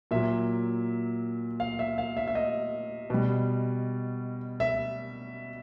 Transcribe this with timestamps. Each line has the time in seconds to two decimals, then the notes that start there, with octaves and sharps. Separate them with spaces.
0.11 A#2 F#3 E5
1.60 F5
1.79 E5
1.98 F5
2.17 E5
2.28 E5
2.35 D#5
3.10 B2 G3
4.60 E5